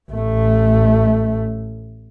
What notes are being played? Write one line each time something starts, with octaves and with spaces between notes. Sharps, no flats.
A1 A3